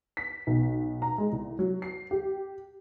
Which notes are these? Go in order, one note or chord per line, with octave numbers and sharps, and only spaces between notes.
B6
B1
A#5
G#3
C2
F#3
C7
G4